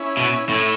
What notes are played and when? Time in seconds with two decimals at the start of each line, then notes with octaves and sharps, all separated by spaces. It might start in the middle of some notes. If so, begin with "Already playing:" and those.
Already playing: C#4 E4
0.17 B2
0.49 A2 C#4 E4